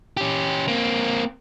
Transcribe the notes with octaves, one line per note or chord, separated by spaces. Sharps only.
C#4 G4
A#3 C4